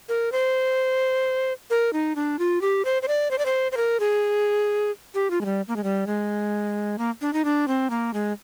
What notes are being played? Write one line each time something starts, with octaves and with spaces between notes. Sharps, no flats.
A#4
C5
A#4
D#4
D4
F4
G4
C5
C5
D5
C5
D5
C5
C5
A#4
G#4
G4
F4
G#3
G3
A#3
G#3
G3
G#3
A#3
D4
D#4
D4
C4
A#3
G#3